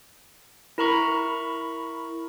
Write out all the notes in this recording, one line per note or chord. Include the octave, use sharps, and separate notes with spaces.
E4 A#4 A#5 B5 C#6